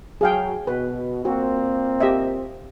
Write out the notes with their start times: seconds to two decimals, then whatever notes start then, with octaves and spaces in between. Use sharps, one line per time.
0.21 F#3 G#4 F5 G5
0.67 B2 B4
1.25 A#2 A#3 C4 F#4
2.00 G4 D#5 E5